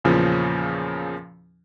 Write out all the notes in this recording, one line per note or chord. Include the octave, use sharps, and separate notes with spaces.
E2 A#2 C#3 F3 C#4